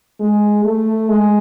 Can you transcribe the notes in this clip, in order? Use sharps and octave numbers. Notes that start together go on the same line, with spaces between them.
G#3
A3
G#3